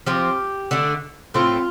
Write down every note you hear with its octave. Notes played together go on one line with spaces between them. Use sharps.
F3 C4 G4
D3 A3 D4
A2 A3 C4 F4